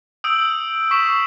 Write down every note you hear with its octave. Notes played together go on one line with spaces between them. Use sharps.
D#6 E6 G6 D7 F#7
C#6 B6 C7 E7